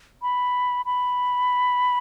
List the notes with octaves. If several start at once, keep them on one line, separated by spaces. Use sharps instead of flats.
B5
B5